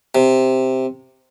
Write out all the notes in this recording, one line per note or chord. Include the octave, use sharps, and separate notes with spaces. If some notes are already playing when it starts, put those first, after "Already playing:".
C3